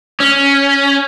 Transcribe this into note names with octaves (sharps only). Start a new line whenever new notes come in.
C#4